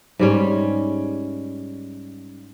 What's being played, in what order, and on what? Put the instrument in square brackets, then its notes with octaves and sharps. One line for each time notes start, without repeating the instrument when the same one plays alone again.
[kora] G#2 G3 C#4